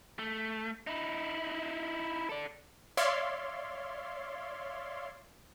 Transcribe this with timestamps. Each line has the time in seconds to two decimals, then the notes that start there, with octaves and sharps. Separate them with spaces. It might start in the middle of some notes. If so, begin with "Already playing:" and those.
0.19 A3
0.87 D#4 E4
2.29 A4 D5
2.97 C#5 D5 E5 F5 C6